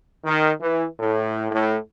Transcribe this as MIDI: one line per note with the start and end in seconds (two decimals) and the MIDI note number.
0.24 0.51 51
0.59 0.85 52
0.99 1.49 45
1.52 1.77 45